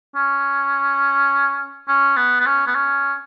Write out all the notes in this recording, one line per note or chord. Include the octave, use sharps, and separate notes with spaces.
C#4
C#4
B3
B3
C#4
B3
C#4